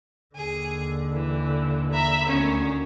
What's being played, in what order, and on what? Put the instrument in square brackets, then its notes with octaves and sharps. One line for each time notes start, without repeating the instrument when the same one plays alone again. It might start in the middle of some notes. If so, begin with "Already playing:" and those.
[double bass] D#2 D3 [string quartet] G#4
[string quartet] E3
E5 A#5 B5
D2 D#3 C#4